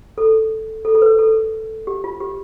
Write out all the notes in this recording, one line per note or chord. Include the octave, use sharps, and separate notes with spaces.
A4
A4
A4
B4
A4
G4
F4
G4